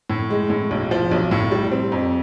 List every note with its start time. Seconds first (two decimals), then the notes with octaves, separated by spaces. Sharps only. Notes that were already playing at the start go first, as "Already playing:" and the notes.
0.10 A2
0.30 G#3
0.50 A2
0.71 B1
0.91 F3
1.12 B1
1.31 A2
1.51 G3
1.71 C4
1.92 F2